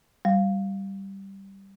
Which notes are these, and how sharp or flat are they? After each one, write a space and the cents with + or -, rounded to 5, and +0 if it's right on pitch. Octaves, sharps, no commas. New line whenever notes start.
G3 -5 F5 +0